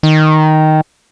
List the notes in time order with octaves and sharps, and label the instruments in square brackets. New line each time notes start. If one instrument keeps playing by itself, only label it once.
[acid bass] D#3